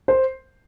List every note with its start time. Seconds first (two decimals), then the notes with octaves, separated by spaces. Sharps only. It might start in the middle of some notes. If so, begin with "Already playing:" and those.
0.08 C5